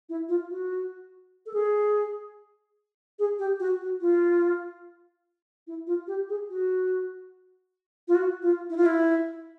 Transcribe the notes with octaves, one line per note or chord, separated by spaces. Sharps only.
E4
F4
F#4
A4
G#4
G#4
G4
F#4
F#4
F4
E4
F4
G4
G#4
F#4
F4
F#4
F4
E4
F4
E4